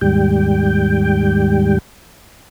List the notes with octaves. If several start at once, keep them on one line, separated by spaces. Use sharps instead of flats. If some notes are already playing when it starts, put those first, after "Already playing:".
D#2 G#2 G3 G5